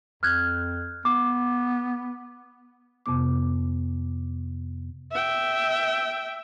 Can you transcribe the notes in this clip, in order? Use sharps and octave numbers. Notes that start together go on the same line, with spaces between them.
F2 F6 F#6 G#6
B3 D6
F2 C3 B3 D6
E5 G5